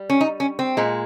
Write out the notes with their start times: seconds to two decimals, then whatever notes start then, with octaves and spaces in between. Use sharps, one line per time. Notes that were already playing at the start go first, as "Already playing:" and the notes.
Already playing: G3
0.10 C#4
0.21 D#4
0.40 C#4
0.59 C4
0.77 A#2 G#3